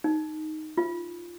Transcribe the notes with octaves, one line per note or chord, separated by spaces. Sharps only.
D#4
F4